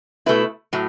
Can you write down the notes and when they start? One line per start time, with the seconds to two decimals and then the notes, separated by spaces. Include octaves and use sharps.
0.26 B2 A3 E4 B4
0.73 A2 F#3